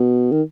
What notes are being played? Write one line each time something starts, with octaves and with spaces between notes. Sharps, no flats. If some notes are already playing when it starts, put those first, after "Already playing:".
Already playing: B2
D#3